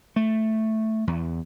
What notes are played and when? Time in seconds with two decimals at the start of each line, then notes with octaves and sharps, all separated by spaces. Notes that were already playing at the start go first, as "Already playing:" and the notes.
0.16 A3
1.07 E2